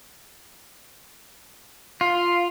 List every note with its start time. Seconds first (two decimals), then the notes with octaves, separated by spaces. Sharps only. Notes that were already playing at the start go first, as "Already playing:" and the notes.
2.01 F4